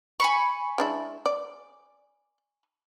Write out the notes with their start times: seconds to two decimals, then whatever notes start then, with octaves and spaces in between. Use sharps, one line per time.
0.20 G#5 B5 C#6
0.78 G#3 D4 E4
1.26 D5